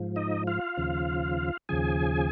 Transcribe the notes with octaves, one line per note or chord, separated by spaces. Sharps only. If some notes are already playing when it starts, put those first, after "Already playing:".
Already playing: G#2 F3
D#4 D#5
F4 F5
D#2 C#3 F3
D#2 C#3 F3 G#4 G#5